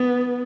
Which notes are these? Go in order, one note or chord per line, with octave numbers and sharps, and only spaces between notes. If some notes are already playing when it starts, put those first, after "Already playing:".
Already playing: B3